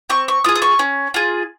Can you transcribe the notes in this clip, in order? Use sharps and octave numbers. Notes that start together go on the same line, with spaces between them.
C4 C#6
C#6
F4 G#4 D#6
D#6
C#6
C#4
F4 G#4